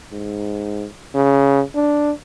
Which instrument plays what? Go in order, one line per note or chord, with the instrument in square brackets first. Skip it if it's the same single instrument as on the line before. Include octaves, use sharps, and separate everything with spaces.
[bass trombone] G#2
C#3
D4